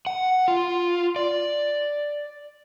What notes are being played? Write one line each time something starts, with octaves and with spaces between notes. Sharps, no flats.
F#5
F4
D5